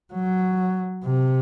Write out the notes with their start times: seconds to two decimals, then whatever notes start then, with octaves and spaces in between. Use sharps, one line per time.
0.13 F#3
1.05 C3